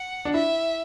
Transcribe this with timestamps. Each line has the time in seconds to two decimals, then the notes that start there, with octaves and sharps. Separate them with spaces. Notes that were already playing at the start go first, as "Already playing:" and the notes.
Already playing: F#5
0.25 D4
0.34 E4 E5